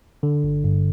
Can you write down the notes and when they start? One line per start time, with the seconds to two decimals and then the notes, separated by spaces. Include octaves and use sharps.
0.23 D3
0.44 G1
0.64 G2